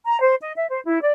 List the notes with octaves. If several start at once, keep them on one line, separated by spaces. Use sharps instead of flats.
A#5
C5
D#5
E5
C5
E4
D5